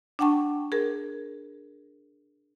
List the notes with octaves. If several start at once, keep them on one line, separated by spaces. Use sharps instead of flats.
D4 F#5 G5 A5 C#6
G#4 A#4